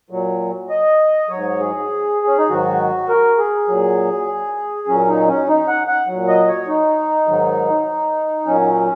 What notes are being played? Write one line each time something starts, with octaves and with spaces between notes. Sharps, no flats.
A#2 F#3
D#5
G#2 F#3 C#5
G#4
C#4
D#4
G#2 D#3 F#3 F#4
A#4
G#4
A#2 F#3
A#2 F#3 C#4
D#4
C#4
D#4
F#5
F#5
F#3
A#2
D#5
C#5
D#4
G#2 D#3 F#3
A#2 F#3 C#4